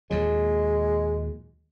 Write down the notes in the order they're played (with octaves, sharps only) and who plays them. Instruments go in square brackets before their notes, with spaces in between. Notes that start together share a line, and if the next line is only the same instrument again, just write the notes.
[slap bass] D#2 A#2 F#3 [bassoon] G#3